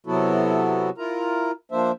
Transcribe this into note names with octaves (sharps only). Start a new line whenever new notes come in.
C3 F#3 B3 E4 F#4 A4
E4 F4 A#4 A#5
F3 A#3 D4 C5 E5